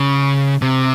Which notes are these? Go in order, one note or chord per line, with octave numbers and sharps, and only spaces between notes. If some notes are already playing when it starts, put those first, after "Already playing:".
Already playing: C#3
C3